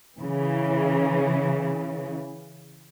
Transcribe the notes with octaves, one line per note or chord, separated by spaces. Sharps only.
C#3 E3